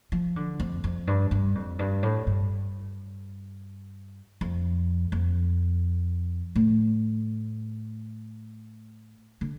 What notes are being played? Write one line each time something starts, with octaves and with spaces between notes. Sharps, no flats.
F3
D3
F2
F2
G2
G2
F2
G2
A2
G2
F2
F2
A2
D3